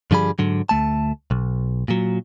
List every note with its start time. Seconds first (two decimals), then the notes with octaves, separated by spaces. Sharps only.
0.11 G2 D3 F3 G3 G#4 B5
0.39 G#2 D3 F#3
0.69 D2 A3 A5
1.31 B1
1.88 A#2 F#3